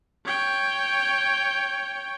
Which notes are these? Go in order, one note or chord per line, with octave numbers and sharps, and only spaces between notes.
C#5 G5